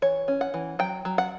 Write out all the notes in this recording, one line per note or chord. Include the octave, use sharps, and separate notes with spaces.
E3 C#5
C#4
F#5
E3
F#3 G5
F#3
F#5